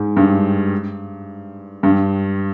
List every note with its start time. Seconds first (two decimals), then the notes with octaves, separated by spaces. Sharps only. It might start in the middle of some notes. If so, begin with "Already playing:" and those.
Already playing: G#2
0.17 G2
1.83 G2